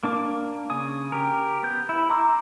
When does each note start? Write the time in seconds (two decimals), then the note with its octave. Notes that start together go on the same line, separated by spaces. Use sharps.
0.03 A#3 D4 D6
0.70 C#3 G#5 D#6
1.12 G4 A#4
1.63 B3 G6
1.89 E4
2.10 A#5 C6 D6 E6